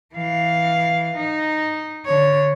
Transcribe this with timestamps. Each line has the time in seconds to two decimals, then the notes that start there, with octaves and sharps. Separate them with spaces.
0.14 E3 F5
1.17 D#4
2.05 D3 C#5